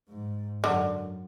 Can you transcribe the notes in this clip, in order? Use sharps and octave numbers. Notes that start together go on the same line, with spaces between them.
G#2
F#2 D3